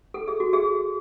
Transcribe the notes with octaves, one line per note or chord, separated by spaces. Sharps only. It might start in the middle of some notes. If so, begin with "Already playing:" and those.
A4
G#4
F#4
G#4